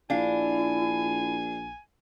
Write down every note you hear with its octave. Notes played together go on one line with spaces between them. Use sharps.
A#1 D4 E4 F5 G#5